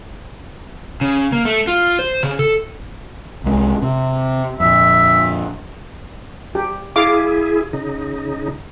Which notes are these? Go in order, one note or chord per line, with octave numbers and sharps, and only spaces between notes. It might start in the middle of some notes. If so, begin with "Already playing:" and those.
C#3
A#3
A3
F4
C5
C#3
A4
C2 G#3
C3
F2 A#2 E5
G4
E4 G#4 F5 D6
C#3 D#4